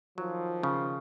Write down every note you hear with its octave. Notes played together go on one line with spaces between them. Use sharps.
D#3 F3 F#3
C#3